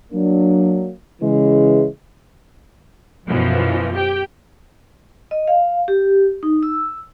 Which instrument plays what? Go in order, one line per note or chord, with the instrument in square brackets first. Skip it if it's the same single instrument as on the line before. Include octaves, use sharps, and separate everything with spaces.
[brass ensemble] F#3 A#3 D4
C#3 E3 G#3
[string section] F#2 B2 E3 F3
G4 G5
[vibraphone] D#5
F5
G4
D#4
E6